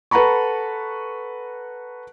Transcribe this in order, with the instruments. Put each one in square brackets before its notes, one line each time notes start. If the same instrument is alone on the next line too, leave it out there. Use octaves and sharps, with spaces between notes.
[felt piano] A4 B4 F#5 A#5 B5 C#6